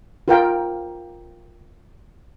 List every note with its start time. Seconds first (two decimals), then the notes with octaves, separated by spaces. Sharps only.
0.28 F4 A#4 G5